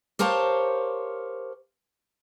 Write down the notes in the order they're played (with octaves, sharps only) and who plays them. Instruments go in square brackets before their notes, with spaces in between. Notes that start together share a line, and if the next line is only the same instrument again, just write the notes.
[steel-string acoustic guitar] G4 A#4 C5 C#5 F5 A5